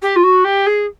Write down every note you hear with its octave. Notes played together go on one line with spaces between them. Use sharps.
G4
F4
F#4
G4
G#4